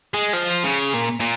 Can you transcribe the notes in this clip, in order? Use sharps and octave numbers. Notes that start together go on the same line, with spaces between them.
G#3
F3
C#3
A#2
A#2